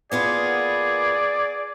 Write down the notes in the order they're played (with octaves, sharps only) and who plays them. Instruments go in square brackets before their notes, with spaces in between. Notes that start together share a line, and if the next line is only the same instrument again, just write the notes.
[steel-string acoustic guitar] A#3 B3 F4 [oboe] G#4 [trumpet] D5